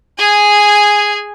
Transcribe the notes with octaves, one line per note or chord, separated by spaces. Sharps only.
G#4 G#5